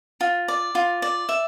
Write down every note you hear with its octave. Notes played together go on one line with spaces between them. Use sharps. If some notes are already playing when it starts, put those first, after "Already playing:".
F4
D5
F4
D5
E5